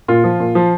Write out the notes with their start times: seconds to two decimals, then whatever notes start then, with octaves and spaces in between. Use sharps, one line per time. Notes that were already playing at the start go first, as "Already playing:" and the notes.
0.08 A#2 F4
0.24 F3
0.40 A#2
0.55 F3